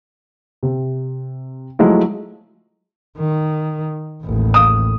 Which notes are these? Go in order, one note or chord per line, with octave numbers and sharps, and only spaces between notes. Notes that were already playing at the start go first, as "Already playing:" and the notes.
C3
F3 F#3 G#3 A3 E4
D#3
A1 D#2
D#6